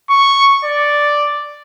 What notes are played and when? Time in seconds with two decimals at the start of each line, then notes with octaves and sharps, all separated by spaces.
0.10 C#6
0.65 D5